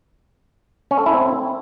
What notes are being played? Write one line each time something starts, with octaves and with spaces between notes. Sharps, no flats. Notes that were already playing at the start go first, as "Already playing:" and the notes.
C#4
A4
E4
C4